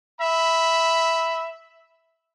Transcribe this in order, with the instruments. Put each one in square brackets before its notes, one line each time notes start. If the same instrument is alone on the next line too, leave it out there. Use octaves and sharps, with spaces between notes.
[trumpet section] E5 B5